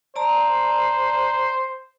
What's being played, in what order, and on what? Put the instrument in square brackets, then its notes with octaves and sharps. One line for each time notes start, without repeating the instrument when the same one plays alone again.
[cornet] C5 [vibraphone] D5 A5 A#5